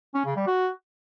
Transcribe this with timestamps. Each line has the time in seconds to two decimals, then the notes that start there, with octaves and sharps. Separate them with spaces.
0.15 C#4
0.26 C#3
0.36 G3
0.47 F#4